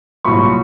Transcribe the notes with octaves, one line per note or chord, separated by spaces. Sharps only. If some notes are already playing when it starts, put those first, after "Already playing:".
C2 A#2 F#3 B5 C#6